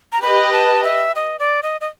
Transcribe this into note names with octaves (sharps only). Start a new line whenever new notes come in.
A#5
G4 B4 D#5 B5
A5
E5
D#5
D5
D#5
D#5